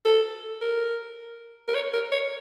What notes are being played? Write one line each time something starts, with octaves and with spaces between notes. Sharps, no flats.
A4
A#4
A#4
C#5
A#4
C#5